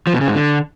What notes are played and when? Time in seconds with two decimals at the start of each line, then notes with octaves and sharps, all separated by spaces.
0.07 F3
0.14 B2
0.21 C#3
0.28 G#2
0.35 D3